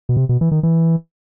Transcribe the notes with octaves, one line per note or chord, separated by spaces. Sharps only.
B2
C3
B2
E3
D#3
E3